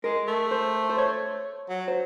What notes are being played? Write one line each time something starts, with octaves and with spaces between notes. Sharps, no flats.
G#3 A#4
A3
C5
C5
C#5
F#3
C5